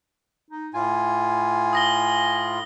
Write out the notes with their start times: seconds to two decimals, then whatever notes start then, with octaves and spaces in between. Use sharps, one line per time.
0.51 D#4
0.74 A2 F4 G#5
1.73 D#6 A#6 G7